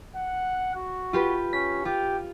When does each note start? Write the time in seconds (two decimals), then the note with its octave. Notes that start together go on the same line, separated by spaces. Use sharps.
0.16 F#5
0.75 F#4
1.13 F4 G4 B4
1.53 C#4 B6
1.85 F4 G4